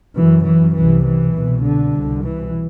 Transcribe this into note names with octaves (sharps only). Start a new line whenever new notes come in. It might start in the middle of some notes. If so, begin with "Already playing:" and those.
F#2 E3
E3
C2 C3 E3
E3
C2 B2
D3
C2 B2
E3